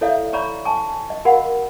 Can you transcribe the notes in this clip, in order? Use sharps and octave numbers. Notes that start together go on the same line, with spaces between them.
E4 A4 C#5 D5 E5 F5
C#5 D5 A#5 B5 C#6
G#5 A5 C#6
D#5
F#4 A#4 F5 F#5 B5